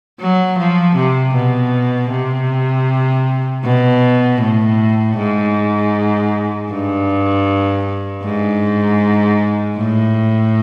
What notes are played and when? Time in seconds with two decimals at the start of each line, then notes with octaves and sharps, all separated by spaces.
0.20 F#3
0.59 F3
0.96 C3
1.35 B2
2.11 C3
3.65 B2
4.42 A2
5.18 G#2
6.71 G2
8.24 G#2
9.78 A2